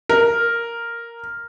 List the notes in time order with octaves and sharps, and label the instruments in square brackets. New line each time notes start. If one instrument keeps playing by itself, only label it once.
[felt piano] A#4